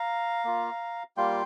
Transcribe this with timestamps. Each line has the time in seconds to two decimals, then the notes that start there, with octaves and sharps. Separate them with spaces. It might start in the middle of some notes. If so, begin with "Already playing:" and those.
Already playing: F5 A#5
0.45 A#3 F4
1.17 G3 A#3 F4 G5 C6